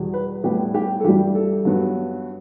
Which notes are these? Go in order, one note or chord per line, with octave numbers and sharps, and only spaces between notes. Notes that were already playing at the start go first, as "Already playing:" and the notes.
Already playing: E2 B2 G3
B4
A2 G3 B3 G4
G4
A4
G2 E3 G3 G4
A4
G2 F#3 B3